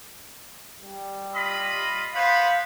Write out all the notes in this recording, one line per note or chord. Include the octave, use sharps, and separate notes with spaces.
G3
F4 D#5 B5
B3 C5 F5 B5